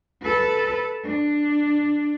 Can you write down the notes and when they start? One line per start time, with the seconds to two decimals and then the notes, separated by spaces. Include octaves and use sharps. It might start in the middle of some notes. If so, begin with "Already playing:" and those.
0.23 A4 B4
1.04 D4